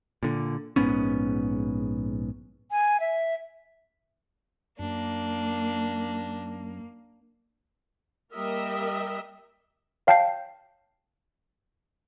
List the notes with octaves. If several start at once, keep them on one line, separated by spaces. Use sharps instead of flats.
A#2 D3
A#1 G#2 B3 C#4
G#5
E5
F#2 A#3 D4
G3 A#3 A#4 D#5 E5
C#5 F5 G5 A5 G6 C7